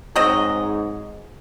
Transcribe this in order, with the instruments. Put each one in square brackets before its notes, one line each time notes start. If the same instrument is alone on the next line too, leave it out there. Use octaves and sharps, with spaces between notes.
[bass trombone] G#2 [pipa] F#3 C4 D#5